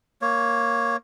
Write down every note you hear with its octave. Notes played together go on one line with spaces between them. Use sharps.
A#3 C#5